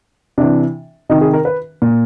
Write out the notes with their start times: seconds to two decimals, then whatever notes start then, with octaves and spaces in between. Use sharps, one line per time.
0.38 C3 E3 D4
1.09 C3 D#3 D#4
1.21 G#4
1.33 A#4
1.45 B4
1.82 A#2